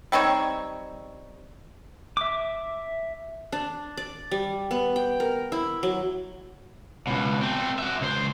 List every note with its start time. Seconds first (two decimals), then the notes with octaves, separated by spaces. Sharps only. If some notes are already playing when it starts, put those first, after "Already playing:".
0.12 G3 C4 D#4 C#5
2.17 E5 D6
3.52 D4
3.97 D5
4.31 G3
4.71 B3
4.96 G5
5.20 A#4
5.52 E4
5.83 F#3
7.07 C#2 B2
7.42 A3 C4
7.79 F#4 E5
8.01 C#2 C5